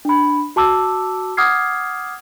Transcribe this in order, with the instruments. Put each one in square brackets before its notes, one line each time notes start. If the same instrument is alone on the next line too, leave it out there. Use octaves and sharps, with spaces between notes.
[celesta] D4 B5
F#4 A5 D6 E6
F#5 D6 D#6 F6 G#6 C7